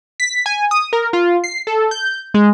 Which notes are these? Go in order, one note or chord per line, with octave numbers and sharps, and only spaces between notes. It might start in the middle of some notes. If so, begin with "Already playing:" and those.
B6
G#5
D#6
A#4
F4
C7
A4
G6
G#3